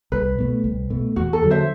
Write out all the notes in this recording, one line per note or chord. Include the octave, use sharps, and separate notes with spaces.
C2 B4
B2 A3
C2
B2 A3
E2 F#4
A4
D3 F#3
C5 E5